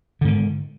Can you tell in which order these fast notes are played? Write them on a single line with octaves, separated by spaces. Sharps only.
D3 G#2 D#3